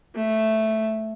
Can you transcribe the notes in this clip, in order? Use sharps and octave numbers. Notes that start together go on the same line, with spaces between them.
A3